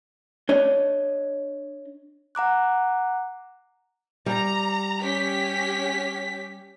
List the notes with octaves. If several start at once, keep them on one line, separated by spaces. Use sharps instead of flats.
D4 C#5 D#5
F#5 A#5 D6 F#6
G3 A#5
C#4 G4 B6